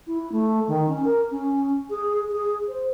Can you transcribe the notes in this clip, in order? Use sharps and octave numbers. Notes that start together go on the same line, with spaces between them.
E4
A3
D#3
C#4
A#4
C#4
G#4
G#4
C5